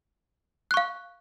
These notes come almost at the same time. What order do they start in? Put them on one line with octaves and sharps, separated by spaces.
F#6 C#6 F5